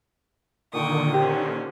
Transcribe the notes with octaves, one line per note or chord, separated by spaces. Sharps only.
A#2 D3 D#3 G5 C#6 D#6
C#4 G4 C5